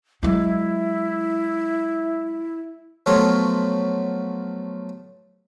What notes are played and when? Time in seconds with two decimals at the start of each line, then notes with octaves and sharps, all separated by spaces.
0.23 F#3 G#3 E4
3.06 F3 F#3 A3 B3 F4 C#5